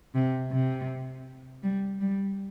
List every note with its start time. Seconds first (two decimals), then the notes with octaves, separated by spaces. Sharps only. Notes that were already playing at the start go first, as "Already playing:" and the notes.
0.15 C3
0.52 C3
1.63 G3
2.01 G3